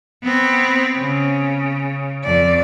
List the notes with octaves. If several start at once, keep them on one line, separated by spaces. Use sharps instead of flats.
B3 C4
C#3
F2 D5